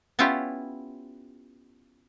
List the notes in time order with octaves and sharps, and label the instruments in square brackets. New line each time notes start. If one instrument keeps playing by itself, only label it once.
[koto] B3 C#4 E4 F4 G4